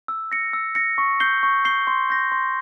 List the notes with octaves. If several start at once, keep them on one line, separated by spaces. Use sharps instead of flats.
E6
A#6 C#7
E6
A#6 C#7
C#6
G6 C7 G7
C#6
G6 C7 G7
C6
G6 A#6
C6